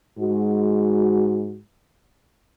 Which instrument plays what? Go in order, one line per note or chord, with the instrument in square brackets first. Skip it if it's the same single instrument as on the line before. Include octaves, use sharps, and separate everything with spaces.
[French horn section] G#2 G#3 F#4